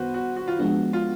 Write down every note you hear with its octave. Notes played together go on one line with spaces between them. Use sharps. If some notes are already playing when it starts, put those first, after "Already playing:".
Already playing: F#2 D#3 G3 B3 F#4 B4 C5
F#4
F#4
F4
F3 G#3 B3 D4 F#4
F4